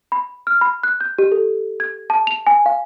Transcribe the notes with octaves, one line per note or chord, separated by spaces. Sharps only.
B5
F6
B5
F#6
G6
G4
A4
G#6
A5
F7
G#5
F5